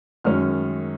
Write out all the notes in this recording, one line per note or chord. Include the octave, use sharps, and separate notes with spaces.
F#2 D#3 G#3 C#4 F6